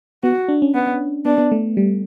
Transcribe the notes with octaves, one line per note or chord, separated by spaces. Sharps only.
B3 F#4
D4
C#4
B3
B3 D4
B3
A3
G3